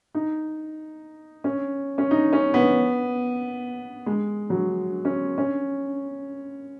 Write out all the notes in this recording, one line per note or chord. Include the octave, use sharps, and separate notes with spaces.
D#4
C#4
C#4
D#4
C#4
B3
G#3
F#3
C#4
C#4